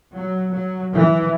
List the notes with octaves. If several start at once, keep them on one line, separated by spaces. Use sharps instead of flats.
F#3
F#3
E3